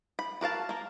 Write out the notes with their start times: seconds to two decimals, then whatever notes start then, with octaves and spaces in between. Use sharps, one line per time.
0.19 B5
0.41 F#4 A#4 F5 A5
0.69 A#3 A#4